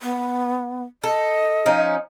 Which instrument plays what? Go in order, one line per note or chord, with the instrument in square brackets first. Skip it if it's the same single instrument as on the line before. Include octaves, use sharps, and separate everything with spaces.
[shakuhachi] B3
[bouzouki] A4 [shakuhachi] D#5
[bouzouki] F3 C#4 D#4